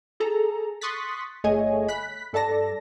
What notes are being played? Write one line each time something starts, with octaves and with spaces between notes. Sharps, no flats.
G#4 A4 A#5
C6 C#6 D#6 F#6 A6 B6
G1 A3 G#4 C#5 D#5 G#5
B5 F#6 B6
G2 A4 D5 A5 A#6